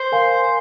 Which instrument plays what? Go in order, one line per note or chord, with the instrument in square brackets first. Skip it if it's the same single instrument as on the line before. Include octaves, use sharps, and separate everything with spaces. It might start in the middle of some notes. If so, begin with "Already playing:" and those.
Already playing: [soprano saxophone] C5
[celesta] A#4 F5 G#5 C6